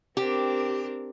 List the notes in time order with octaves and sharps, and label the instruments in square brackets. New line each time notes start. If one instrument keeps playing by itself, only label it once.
[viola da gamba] C4 D4 A#4 [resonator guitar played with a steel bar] G4